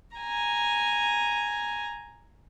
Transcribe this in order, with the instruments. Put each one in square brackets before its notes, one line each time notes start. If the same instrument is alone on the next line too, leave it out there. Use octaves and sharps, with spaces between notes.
[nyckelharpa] G#5 A#5